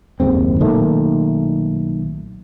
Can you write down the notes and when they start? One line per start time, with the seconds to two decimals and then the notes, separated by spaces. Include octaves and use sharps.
0.20 F#1 D#2 G#2 C4
0.60 B1 A#2 D#3 A3